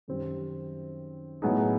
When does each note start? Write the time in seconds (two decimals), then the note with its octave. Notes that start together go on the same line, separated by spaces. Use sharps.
0.08 F#2 D#3 G3 C4
1.42 A2 F#3 B3 D#4 G#4